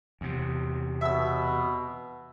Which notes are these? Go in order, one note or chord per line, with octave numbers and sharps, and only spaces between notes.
E2 C3
B2 E5 E6